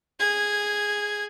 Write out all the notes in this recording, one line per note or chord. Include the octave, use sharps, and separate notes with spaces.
G#4 G#6